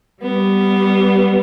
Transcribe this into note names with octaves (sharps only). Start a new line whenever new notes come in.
G3 B3